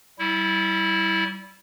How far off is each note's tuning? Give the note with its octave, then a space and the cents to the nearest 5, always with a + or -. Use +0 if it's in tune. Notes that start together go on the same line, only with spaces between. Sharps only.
G3 -30 E4 -15